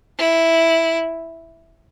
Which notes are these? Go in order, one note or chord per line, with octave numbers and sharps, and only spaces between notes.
E4